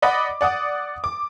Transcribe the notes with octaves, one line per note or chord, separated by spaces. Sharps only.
D5 D#5 F#5 B5 D6
D5 F#5 D6 D#6
D6